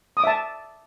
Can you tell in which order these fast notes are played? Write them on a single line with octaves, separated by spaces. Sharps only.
D#6 D6 E5 A5